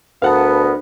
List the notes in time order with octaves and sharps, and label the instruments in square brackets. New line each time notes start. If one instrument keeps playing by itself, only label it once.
[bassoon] D2 [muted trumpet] B3 [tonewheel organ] D4 A#4 B4 [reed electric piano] F5 F#5 A5